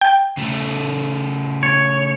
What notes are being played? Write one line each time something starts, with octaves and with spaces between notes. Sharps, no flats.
G5
C#3 A3
C#5